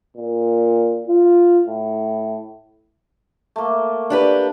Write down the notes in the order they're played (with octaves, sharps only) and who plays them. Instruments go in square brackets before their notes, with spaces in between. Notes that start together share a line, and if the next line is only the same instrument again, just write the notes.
[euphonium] A#2
F4
A2
[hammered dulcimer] A3 A#3
[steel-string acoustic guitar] D4 G4 B4